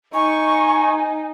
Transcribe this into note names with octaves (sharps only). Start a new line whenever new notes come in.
D#4 G#5 C#6